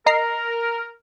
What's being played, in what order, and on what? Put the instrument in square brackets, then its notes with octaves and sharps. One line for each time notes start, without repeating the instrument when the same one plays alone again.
[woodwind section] A#4 [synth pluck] D#5 A#5 C7